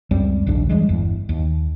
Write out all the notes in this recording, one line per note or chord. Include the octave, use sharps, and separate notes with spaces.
C#2 F#2 G3 C4
A#1 D#2 G#2 D4
E3 G3 G#3
G1 E2
D#2